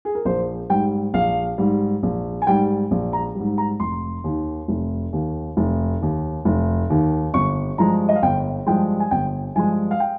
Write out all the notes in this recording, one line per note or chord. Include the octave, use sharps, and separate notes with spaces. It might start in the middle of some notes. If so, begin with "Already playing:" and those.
G#4
A#4
A#1 C5
G#2 G3 G5
A#1 F5
G#2 G3
A#1
G#5
G#2 G3 G5
A#1
A#5
G#2 G3
A#5
F1 C6
D#2 D#3
F1
D#2 D#3
F1
D#2 D#3
F1
D#2 D#3
G1 C#6
G2 F3 G#3 A#5
D#5
F5
G1 G5
G2 F3 G#3 G5
G#5
G1 G5
G2 F3 G#3 G#5
F5
G5